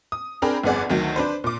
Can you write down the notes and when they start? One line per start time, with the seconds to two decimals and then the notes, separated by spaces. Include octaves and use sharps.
0.12 D#6
0.42 C4 D4 G#4 A#4 G5 B5
0.64 G1 F2 B3 G#4 D5 F#5
0.89 D2 D#3 F#3
1.16 D4 B4 C5
1.44 A#2 D6